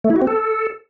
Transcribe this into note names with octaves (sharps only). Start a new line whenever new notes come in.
A3
E4
F#4
C4
A4